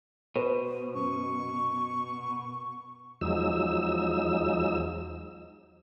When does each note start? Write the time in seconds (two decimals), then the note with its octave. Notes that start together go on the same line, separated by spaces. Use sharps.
0.36 B2 B4 C5
0.94 F#2 C#6
3.21 E2 F3 F#3 G#3 D#4 E6